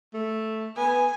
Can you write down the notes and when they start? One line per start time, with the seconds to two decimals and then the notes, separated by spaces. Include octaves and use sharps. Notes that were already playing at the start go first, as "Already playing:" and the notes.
0.14 A3
0.77 B3 G#5